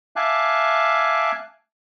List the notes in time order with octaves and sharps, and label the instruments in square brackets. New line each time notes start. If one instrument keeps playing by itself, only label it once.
[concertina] E5 F5 G#5 A5 D6 F#6